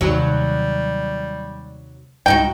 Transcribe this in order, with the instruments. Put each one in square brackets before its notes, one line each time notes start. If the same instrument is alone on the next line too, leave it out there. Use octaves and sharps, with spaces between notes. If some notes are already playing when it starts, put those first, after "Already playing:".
[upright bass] D#2 C3 [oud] F#3 [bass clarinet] G3
[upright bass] C#2 E4 [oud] G2 D#4 F#4 [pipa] G5